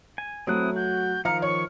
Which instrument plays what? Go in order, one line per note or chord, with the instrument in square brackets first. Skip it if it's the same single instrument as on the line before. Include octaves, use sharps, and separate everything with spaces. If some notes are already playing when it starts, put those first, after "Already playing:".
[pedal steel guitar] G#5
[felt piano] F#3 A3 [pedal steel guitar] C4 E4 F#6 [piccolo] D#6
[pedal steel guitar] F#4 [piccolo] G6
[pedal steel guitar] D#3 F3 [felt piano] F5 A#5 F6 [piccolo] C#7
[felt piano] C#5 [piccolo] C#6